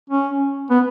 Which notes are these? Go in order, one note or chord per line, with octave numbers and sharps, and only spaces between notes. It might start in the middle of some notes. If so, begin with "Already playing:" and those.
C#4
B3